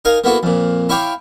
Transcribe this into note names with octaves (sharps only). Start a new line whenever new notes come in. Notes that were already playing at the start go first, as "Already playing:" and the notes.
D#4 A#4 F5 G#5
A#3 B3 E4 F#4 A4
F2 A#2
E4 C#5 F5 G5 D6